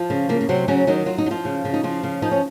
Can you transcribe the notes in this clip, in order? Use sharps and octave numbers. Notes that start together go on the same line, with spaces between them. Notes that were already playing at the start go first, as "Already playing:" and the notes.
Already playing: F3 F4
C#3
C#3 A#3
A#3
C3 F#3 C4
C#3 F#3 C#4
D#3 F#3 D#4
F#3 F4
D#4
F#3
F3 F4
C#3
C#3
D#4
C#3 F3 F4
C#3
F3 D#4
C#4